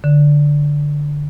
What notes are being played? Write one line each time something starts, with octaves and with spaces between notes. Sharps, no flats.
D3